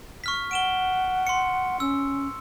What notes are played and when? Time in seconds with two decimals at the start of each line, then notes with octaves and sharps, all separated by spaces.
0.24 C#6 F6 B6
0.51 F#5 D7 E7 G7
1.27 C6 C#7
1.80 C#4 E6